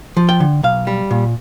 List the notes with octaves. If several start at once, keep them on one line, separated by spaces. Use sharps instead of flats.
F3
G5
D3
B1 F5
G3
A#2